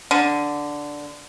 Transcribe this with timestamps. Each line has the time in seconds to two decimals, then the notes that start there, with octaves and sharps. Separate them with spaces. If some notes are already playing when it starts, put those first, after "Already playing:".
0.11 D3